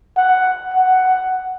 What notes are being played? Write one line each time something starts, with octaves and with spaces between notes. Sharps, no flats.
F#5
F#5